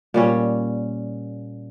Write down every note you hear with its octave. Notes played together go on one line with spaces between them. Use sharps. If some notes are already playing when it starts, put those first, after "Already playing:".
A#2 G3 C#4